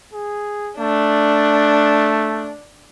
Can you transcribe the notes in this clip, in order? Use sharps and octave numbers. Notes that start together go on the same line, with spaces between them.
G#4
A3 D4